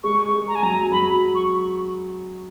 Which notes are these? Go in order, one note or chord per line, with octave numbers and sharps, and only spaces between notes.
G#3 C#6
G#3
A#5
G#5
F#3 A#5
F#3 B5
C#6